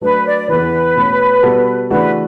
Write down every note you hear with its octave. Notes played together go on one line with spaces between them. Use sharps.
F#3 A3 D4 A4 B4
D5
E2 C#3 E3 B4
B2 A3 C#4
B2 G3 B3 F#4 A4
C#3 E3 A3 D4 F#4 B4